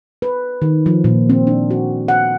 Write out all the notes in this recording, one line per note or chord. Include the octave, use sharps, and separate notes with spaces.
B4
D#3
F3
A#2
C4
D4
F#4
F#5